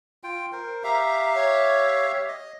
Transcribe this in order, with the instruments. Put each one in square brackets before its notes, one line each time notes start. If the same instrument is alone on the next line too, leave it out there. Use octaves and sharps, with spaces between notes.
[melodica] F4 G5
A#4 C5
[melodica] G4 E5 F5 [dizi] A#5
[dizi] C#5
[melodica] D#5